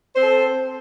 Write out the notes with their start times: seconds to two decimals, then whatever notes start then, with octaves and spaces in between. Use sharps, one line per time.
0.14 C5
0.17 C4
0.20 A4